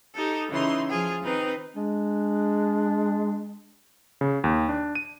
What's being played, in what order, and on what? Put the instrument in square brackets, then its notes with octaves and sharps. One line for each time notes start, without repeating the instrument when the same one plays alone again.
[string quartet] D#4 G4 A4
C#3 E3 D#4 C6
F3 F4 G#4
D#3 C4 D#4 B4
[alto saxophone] G#3 [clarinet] D4
[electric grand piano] C#3
D#2
D4
D#7